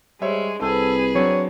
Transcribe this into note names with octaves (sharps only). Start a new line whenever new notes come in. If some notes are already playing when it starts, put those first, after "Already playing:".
G3 G#3 C5 C#5 E5
C2 C4 G#4 A4 B4
F#3 C4 D4 C#5